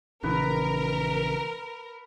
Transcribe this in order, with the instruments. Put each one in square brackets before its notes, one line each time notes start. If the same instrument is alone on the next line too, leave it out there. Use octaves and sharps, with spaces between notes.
[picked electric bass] A#1 C#3 E3 [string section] A#4 [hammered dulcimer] B4